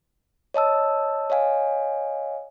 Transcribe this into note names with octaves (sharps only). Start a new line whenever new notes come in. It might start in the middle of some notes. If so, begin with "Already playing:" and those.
C#5 D#5 A5 E6
C#5 D#5 F5 G#5